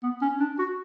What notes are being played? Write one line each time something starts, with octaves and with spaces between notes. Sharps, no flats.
B3
C#4
D4
F#4